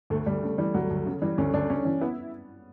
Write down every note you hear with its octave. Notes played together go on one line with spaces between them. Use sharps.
D2 A3
D2 G3
C#3 A3
E3 G3
D2 F#3
D2
C#3
E3 G3
D2 C#4
D2 D4
C#3 C#4
E3 C#4
B3 E4